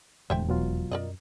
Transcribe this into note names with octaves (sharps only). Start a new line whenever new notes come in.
E1 D2 A2 C5 E5 G5
F1 B2 F#3 F4
F#2 A#4 D5 D#5